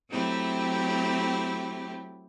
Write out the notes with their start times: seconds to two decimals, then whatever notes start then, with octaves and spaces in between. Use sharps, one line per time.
0.11 F#3 A3 C4 E4 G4